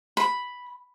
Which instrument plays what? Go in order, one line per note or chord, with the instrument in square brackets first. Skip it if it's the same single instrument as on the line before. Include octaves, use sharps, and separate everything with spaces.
[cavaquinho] B5